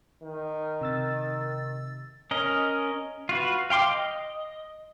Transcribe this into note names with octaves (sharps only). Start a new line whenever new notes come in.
D#3
C3 E6 A6
C#4 A#4 D#5
F4 F#4 B4
F5 G5 C6 D6
D#5